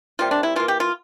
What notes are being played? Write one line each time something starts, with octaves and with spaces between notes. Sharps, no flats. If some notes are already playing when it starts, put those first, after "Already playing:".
C3 G3 A#3 F4
D4
E4
E3 A#3 F4
G4
F4